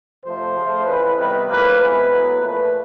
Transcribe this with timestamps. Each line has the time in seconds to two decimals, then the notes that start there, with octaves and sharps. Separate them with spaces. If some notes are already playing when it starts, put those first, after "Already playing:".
0.24 F2 C3 F3 A3 C5
0.55 C#3 F3 A3
0.86 F2 C#3 E3 B4
1.17 C3 D#3 G3 B3 B4
1.48 A2 F3 A#3 B4
1.79 C3 E3 G#3 B3 B4
2.10 A2 F#3 B3
2.41 A#2 F3 A3 B4